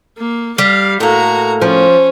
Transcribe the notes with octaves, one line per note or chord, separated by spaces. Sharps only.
A#3
G3 F5
A2 A#3 F#4 A#5
F3 C#4